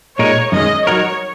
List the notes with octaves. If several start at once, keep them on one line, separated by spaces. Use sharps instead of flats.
A#2 G#3 D#4 A#4 C#5
F#2 D#3 G#3 C#4 D#5
F#3 D#4 F#4 A#4 C#5